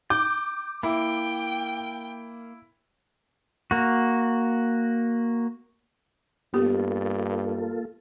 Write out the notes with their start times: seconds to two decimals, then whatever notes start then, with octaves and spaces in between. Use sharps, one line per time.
0.10 G5 D6
0.83 A#3 E4 G5
3.71 A#3 F#4
6.54 G2 A#3 B3 F4 G4 A4